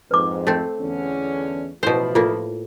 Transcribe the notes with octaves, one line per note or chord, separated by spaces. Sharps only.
F2 G#2 B4 D6
A3 C4
E2 D3 C#4
A1 B2 F3 E4 C5
A2 A#3 F4